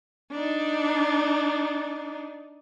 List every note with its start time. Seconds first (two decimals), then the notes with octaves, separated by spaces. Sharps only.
0.31 D4 D#4